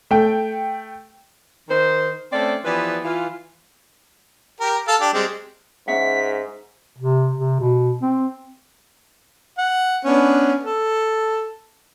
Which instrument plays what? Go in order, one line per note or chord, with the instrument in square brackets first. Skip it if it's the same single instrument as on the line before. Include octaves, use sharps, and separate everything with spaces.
[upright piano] A3 G5
[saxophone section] D#3 C5
A3 C4 C#4 A4 C5 D5
E3 F3 B3 G4 B4 D5
E3 F4
[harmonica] G4 A#4
A4 F5 A5
D4 G4
G3 G#3 C4
[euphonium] G#2 [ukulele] C#4 E5 F#5 [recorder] B6
[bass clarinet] C3
C3
B2
C4
[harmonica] F#5
B3 C#4 D4
A4